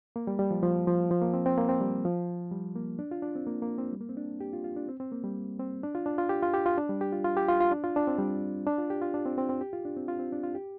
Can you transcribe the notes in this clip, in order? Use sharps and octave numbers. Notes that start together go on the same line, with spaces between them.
A#3
G3
G3
F3
F3
F3
F3
A#3
C4
C4
A#3
C4
G3
F3
G3
A#3
D4
F4
D4
C4
A#3
A#3
C4
G3
A#3
C4
D4
G4
F4
F4
D4
C4
C4
A#3
G3
C4
D4
F4
D4
F4
G4
F4
G4
F4
D4
G3
G4
F4
F4
G4
F4
F4
D4
F4
D4
C4
G3
D4
F4
G4
F4
D4
C4
C4
C4
G4
F4
D4
C4
F4
C4
D4
F4
G4